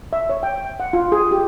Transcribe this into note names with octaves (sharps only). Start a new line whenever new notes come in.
E5
C#5
G5
F#5
F4
G#4
G4